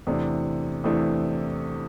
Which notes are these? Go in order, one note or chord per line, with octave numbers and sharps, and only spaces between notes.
E2 C3 E3 A3 D4
E2 C3 E3 A3 D4